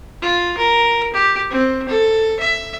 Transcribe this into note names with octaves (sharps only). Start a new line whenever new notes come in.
F4
A#4
G4
C4
A4
E5